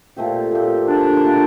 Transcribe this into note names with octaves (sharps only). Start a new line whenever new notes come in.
A#2 A3 C4 G4
A#2 A3 C4 G4
A#2 A3 C4 D4 G4
A#2 A3 C4 G4